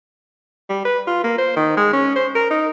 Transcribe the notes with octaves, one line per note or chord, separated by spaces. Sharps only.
G3
B4
F4
A#3
C5
D#3
G#3
C#4
C5
A#4
D#4